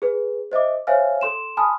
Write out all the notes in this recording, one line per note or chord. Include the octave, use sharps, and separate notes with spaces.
G#4 B4
C5 D#5 E5 D6
C5 C#5 E5 F5 G#5 F6
A4 C6 E7
G#5 A5 B5 C6 D#6 F6